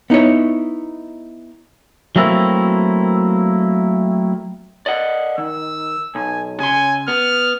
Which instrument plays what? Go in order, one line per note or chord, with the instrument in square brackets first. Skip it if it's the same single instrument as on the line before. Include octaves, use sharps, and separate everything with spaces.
[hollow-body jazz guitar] B3 D#4 E4 C#5
[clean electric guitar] F#3 A3 A#3 C4 E4
D5 D#5 F#5
[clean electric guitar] D#3 [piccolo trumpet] E6
[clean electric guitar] B1 [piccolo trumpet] G#5
[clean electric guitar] C#3 C6 [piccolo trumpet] G#5
[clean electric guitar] B3 [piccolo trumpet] F6